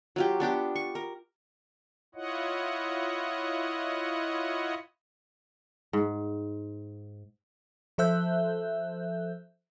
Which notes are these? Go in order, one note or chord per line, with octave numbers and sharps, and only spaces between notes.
F#3 F4 G4
B3 D4 G4 D6
C#6
A#4
E4 F4 C#5 D#5 F#5
G#2
F3 A4 C5 E5 F#6 G6